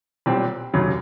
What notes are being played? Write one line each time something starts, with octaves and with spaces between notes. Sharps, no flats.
B1 A#2 G3 C4
F1 D#2 C#3 F#3